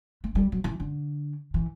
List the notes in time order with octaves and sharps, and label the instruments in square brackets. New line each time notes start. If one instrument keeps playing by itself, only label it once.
[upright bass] A3
G3
F#3
E3
D3
E3